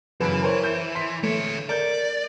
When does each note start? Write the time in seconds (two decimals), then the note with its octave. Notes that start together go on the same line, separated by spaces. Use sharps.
0.21 F#2 C#3 E3 B4 D7
0.42 A#4 C5 C#5
0.64 G6
0.95 C6 B6
1.23 D3 A3 C#5
1.69 A#4 D5 G6